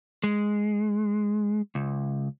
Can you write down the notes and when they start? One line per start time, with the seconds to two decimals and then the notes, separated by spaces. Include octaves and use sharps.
0.23 G#3
1.75 C#2